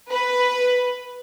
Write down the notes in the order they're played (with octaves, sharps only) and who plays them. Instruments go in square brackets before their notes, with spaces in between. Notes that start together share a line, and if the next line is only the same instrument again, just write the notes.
[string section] B4